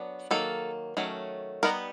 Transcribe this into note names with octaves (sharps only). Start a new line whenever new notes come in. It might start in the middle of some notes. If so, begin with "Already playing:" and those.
Already playing: F#3 B3 D4
D#3 F#3 A#3 A4
D#3 F#3 A3 C#4
G3 B3 D#4 A#4